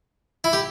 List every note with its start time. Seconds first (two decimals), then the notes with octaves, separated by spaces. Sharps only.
0.44 E4
0.53 G4